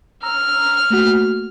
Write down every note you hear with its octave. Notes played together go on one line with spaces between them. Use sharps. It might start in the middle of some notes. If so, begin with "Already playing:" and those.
A#5 E6 F6
A3 A#3 F#4